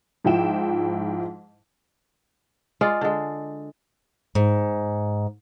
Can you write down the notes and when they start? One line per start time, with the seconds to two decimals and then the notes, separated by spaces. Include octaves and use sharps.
0.25 G#2 F3 E4 G5 E7
2.81 G#3 F4 D5
3.01 D3 G#3
4.35 G#2